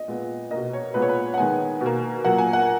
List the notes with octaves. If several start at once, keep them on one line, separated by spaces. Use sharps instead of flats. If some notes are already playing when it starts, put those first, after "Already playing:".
Already playing: D#5
A#2 G#3 B3
A#3 D#5
B2
C#5
A#2 G#3 B3 B4
C#5
B4
F#5
D#3 G#3 B3 G#5
B2 A#3
A#2 F#3 A#3 F#5
G#5
F#5